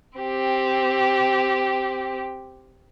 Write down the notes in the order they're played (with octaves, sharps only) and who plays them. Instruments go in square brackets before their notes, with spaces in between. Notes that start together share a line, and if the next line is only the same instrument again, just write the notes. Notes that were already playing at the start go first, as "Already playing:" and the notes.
[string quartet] C4 G4